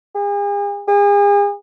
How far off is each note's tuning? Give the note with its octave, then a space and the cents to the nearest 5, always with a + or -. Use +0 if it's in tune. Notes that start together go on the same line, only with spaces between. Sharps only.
G#4 -40
G#4 -40